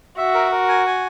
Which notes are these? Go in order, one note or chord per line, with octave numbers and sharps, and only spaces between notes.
F#4 E5
A#4
A#4
G#5
G#5